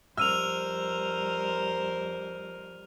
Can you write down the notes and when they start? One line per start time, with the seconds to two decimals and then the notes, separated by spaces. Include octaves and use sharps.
0.17 F2 G3 A#4 C5 E6 F6 D#7 F7